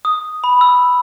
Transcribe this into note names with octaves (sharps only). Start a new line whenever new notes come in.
D#6
B5
E6